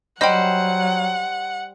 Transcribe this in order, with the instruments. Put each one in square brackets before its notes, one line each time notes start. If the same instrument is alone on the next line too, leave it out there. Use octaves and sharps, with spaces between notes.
[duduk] F#3 [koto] G3 C5 [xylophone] D#5 G5 [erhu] F#5